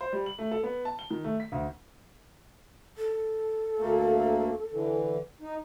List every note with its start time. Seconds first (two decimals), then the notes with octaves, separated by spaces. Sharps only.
0.01 C5
0.12 G3
0.26 F#7
0.39 A3
0.51 A4
0.63 B3
0.85 A5
0.99 G7
1.11 D#3
1.24 A3
1.40 B6
1.52 D2
2.98 A4
3.78 D2 A3 A#3
4.72 D3 E3
5.41 D#4